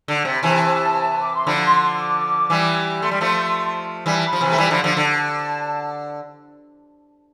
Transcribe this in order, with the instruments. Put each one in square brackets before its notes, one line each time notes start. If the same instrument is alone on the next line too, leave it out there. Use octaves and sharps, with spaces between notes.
[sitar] D3
C3
[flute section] B5
[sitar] C3 E3 [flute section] A5
[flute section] D6
C6
[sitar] D3 F3 [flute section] B5
[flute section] C6
C6
D6
[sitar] E3 G3
[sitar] A3 [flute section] C6
[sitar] G3
F3 A3
[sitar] E3 G3 [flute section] B5
[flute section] A5
B5
[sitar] F3
C3 E3
A3
E3 G3
D3 F3
D3 F3
D3
[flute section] A5